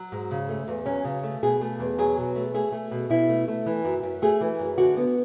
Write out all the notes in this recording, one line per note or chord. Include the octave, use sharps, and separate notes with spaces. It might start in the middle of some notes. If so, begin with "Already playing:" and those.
Already playing: F#3
G#2
C#3
A3
E2
F#3 C#4
C#3
A3
B2 G#4
A3
E2
F#3 G#4
B2
A3
A3 G#4
A3
B2
B2 E4
A3
A3
E3
F#2
F#2
A3 G#4
E3
F#2
D3 F#4
B3